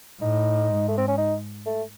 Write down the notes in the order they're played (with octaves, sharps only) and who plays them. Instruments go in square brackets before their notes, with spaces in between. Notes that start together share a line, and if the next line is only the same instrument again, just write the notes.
[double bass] A2 [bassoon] D#4
[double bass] G#2
[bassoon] A3
C4
C#4
D#4
A3